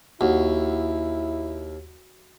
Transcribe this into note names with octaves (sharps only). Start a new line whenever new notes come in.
D#2 E4 F#4